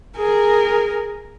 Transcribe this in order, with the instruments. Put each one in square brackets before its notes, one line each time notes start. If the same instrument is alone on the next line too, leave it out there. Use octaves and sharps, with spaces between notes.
[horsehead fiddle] G#4 A#4